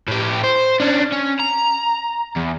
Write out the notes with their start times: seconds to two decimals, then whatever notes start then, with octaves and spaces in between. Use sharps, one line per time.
0.08 A2 G4
0.44 C5
0.80 C#4 D4
1.12 C#4
1.40 A#5
2.36 E2